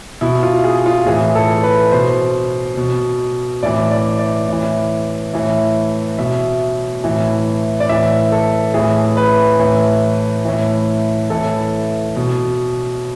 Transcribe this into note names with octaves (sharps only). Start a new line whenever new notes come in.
B2 E4
F4
G#4
F4
A2 E3 G#4
A4
B4
B2 C5
B2
A2 E3 D5
D5
D5
A2 E3
A2 E3
B2 E5
A2 E3
D5
A2 E3 E5
A4
A2 E3 G#4
B4
A2 E3
A2 E3
A2 E3 A4
B2